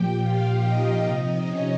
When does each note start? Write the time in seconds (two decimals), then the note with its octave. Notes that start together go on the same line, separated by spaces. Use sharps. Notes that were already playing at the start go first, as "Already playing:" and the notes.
Already playing: A#2 F3 G4 G5
0.21 F4 F5
0.63 D#4 D#5
1.05 C3 F3
1.47 C#4 C#5